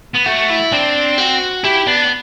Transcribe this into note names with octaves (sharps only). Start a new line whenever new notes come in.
B3
A3 F#4
E4
C4 D4
F#4
E4 G4
B3 D4